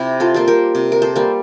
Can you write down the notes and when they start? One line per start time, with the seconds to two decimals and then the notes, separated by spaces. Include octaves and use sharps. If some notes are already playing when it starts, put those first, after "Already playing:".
Already playing: C3 E4 G4
0.20 F4 A4
0.34 G3 A#3 C5
0.48 G4 A#4
0.75 C3
0.92 A#4
1.02 A4 C5
1.16 G3 A#3